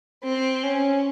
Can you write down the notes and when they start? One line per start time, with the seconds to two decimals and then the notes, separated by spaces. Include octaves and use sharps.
0.24 C4
0.63 C#4